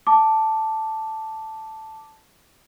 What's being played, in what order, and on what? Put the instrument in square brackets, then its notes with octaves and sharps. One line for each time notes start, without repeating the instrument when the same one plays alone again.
[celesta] A5 D6